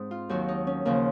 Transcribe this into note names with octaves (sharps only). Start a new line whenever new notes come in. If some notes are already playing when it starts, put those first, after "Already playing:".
Already playing: G#2 C4 D#4
F4
D#2 D#3 F#3 F#4
D#4
C#4
D#2 C#3 F3 A#3